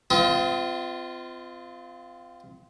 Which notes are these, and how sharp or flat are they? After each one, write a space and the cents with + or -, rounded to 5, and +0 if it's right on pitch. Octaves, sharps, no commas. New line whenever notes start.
C4 -35 F4 -5 D#5 +40